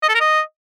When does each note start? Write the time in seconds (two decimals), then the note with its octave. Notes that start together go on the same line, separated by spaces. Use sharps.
0.03 D#5
0.09 A4
0.15 A#4
0.20 D#5